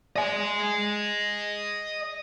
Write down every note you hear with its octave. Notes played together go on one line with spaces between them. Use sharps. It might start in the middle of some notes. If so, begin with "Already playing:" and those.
D#5 G#5